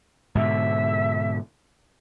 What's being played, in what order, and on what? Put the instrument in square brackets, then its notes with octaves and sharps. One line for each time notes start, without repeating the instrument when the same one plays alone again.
[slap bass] G#2 B2 D3 [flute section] E5